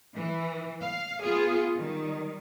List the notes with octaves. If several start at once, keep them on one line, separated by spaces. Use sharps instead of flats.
E3
F5
B3 F4 G#4
D#3 G3